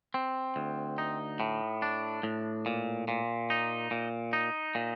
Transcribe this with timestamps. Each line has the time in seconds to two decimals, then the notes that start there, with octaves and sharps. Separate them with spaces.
0.14 C4
0.56 D2
0.98 D#4
1.40 A2
1.82 D4
2.23 A2
2.66 A#2
3.08 A#2
3.50 D#4
3.91 A#2
4.33 D#4
4.75 A#2